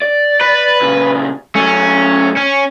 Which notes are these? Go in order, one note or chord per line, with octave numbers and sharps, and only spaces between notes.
D5
B4
A#2 C#3
F#3 A3 C#4
C#4